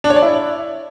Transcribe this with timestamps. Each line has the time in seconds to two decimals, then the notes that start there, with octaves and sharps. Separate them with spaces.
0.04 D4
0.10 C#5
0.16 D5
0.22 E4